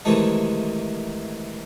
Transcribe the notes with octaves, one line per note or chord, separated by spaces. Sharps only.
C3 D#3 E3 G#3 A3